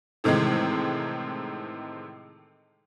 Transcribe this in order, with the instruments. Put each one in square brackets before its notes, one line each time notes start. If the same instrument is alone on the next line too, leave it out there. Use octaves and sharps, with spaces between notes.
[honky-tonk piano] A2 C3 D#3 E3 G#3